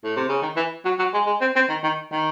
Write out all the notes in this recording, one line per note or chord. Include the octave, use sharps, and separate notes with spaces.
A2
C3
C#3
D#3
E3
F#3
F#3
G#3
G#3
C4
C4
D#3
D#3
D#3